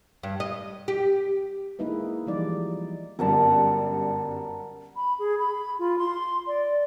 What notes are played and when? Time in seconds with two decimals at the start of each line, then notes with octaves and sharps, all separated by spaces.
0.23 G2
0.40 D#5
0.88 G4
1.79 G#3 A#3 D#4 E4 B4
2.27 E3 F3 G3 G#3 D#4 D5
3.19 G1 F#2 G3 A#4 F#5 A5
4.96 B5
5.19 G#4
5.39 B5
5.79 F4
5.99 C6
6.47 D5